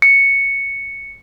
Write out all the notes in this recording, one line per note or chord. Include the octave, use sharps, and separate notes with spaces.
C#7